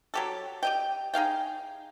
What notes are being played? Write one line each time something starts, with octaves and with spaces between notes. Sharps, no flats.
F#3 G4 A4
G4 D#5 G5
D#4 G#4 F5 G5